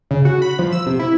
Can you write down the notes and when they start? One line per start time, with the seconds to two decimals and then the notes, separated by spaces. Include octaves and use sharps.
0.11 C#3
0.25 F#4
0.42 B5
0.59 F3
0.73 E6
0.86 C3
0.99 E4